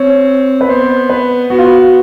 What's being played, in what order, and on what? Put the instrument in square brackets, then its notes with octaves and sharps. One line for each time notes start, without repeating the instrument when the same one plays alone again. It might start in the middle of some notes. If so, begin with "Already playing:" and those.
Already playing: [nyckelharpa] C4 [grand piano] C#5
[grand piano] B4
[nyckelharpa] B3 [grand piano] C5
[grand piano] B4
[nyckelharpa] B3 [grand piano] F#4
[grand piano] F4
F#4